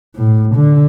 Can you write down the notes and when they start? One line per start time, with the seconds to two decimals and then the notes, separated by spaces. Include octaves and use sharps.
0.16 A2
0.56 D3